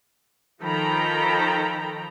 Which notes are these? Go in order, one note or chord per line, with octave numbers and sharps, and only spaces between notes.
D#3 F3 A4 G5 A#5 B5